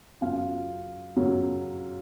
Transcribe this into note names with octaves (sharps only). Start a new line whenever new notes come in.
F#2 C#3 F#3 F4 F5
F#2 C#3 F#3 C#5